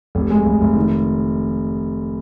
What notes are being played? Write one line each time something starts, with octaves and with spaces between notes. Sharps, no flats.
F1
G#3
F1
F1
D#3